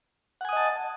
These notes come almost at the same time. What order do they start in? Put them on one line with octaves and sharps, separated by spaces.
F#5 G#5 D#6 D#5 A5